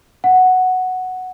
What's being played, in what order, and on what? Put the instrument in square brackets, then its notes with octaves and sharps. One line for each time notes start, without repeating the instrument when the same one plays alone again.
[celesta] F#5